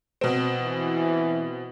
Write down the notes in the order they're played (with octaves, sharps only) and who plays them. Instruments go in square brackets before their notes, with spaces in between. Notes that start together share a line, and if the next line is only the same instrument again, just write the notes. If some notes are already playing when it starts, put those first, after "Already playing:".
[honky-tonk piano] B2 C4
[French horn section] E3